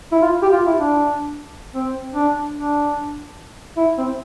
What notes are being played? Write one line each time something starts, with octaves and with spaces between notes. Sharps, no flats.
E4
F4
G4
F4
E4
D4
C4
D4
D4
E4
C4